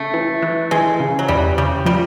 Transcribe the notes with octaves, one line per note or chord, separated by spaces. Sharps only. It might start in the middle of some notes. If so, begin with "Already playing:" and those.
Already playing: C#3 A3
E3
E3
E3 G#3
C#3
F#3
E2 G3
C#3 G3
F3 G3